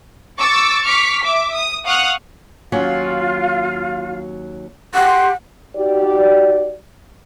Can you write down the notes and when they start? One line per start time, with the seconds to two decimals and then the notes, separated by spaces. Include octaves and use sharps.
0.38 C#6 D6 E6 A6
0.83 C#6 D6 F6 B6
1.21 E5 D6
1.54 D#6
1.84 F5 F#5 C#6 D#6 F6 F#6
2.72 D#2 F#3 C#4 F4 F5
4.94 G4 F#5 C6
5.76 D#4 F#4 G4 D5